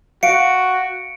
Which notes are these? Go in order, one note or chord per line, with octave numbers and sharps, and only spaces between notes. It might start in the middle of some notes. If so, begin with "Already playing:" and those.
F#4 F5 C#7 D7